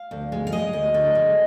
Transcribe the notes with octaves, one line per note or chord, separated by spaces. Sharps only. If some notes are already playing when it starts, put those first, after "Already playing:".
Already playing: F5
D2
G#3
F5
G#3 D#5
D2
D3
G#3